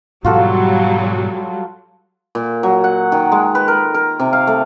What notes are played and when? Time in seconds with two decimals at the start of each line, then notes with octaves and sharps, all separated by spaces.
0.25 G#2 B2 E3 F#3 G3 F4 F#4 A4
2.35 A#2
2.63 F#3
2.84 F#5
3.12 D#3
3.32 G#3
3.55 B4
3.68 A#4
3.94 A#4
4.19 C3
4.33 F5
4.47 A3